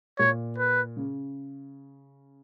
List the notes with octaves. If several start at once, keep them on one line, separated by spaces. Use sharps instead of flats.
A#2 C#5
B4
C#3